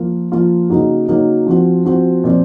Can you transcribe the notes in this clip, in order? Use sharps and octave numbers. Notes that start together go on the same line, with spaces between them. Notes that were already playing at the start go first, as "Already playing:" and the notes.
Already playing: F3 A#3 F4
F3 A#3 F4
C#3 F#3 A#3 D#4 F#4
C#3 F#3 A#3 D#4 F#4
F3 C4 F#4
F3 C4 F#4
A#2 F3 C4